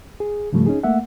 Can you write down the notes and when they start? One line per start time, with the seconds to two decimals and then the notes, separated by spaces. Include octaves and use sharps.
0.20 G#4
0.53 G#2 C#3 F3 G3 A3
0.66 C#4 D#4 G#4
0.83 A3 A#3 E5 F#5